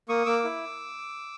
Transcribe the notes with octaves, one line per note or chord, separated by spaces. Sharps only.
A#3 C#6 D#6
A#3 D6 E6
E4